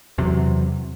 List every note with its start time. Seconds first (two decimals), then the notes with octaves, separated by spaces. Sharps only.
0.18 E2 C3 F#3